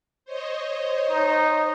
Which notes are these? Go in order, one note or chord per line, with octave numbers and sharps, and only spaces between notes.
C5 C#5 D#5
D#4